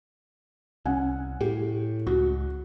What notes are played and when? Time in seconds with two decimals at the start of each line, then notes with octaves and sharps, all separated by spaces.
0.86 C2 C#4 F#5 G#5
1.41 A2 G4
2.07 C#2 F#4